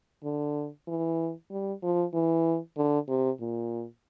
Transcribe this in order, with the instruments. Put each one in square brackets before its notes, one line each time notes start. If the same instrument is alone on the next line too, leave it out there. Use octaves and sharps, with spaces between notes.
[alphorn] D3
E3
G3
F3
E3
D3
C3
A#2